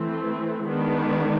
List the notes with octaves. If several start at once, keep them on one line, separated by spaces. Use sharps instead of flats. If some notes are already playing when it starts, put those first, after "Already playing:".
Already playing: E3 A3 C4
D#3 G#3 B3 D4